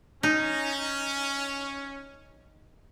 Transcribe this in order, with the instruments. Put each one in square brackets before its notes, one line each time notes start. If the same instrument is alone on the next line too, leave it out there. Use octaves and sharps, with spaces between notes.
[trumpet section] C#4 [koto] D#4